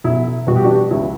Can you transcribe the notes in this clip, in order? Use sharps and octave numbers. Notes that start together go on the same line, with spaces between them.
B1 E4
B2 G3 B3 F#4
G4
D4 F#4
C#2 E4